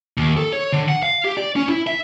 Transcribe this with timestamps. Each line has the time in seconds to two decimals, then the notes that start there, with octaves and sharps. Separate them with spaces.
0.17 D#2
0.37 A4
0.53 C#5
0.73 D3
0.88 F#5
1.03 F5
1.25 G4
1.37 D5
1.56 C#4
1.69 E4
1.87 E5